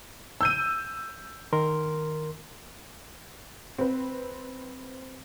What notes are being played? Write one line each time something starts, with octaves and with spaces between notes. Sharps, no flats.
E6 G6 D#7
D#3 A#4 C6
C4 B4